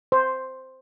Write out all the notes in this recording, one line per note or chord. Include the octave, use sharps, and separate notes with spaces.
C5